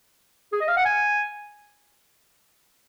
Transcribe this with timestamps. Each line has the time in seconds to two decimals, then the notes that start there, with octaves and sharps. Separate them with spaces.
0.52 G#4
0.61 D#5
0.68 F5
0.76 F#5
0.85 G#5